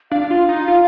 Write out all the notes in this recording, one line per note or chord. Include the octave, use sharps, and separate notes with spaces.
D4 F5
F4
D#4
F4